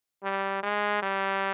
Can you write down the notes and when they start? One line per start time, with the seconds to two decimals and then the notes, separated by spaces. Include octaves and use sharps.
0.23 G3
0.63 G#3
1.02 G3